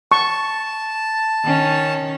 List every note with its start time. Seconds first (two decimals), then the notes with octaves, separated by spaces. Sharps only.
0.12 A5 C#6
1.45 D#3 C#4